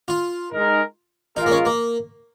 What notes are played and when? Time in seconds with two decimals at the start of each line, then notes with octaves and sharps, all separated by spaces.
0.08 F4
0.51 G#3 D#4 A#4
1.36 G#3 D#4 F4 A#4
1.46 A#3
1.51 C#4
1.65 A#3